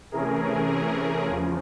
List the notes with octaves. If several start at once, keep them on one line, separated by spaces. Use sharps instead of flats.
C3 E3 A3 C#4 G#4 A#4
G#4
E2 C#3 F3